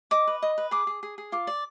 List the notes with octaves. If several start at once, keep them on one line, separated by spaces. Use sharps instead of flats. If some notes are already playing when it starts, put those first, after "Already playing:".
D#5 D6
B4
D#5
B4
G#4 D6
G#4
G#4
G#4
F4 D6
D5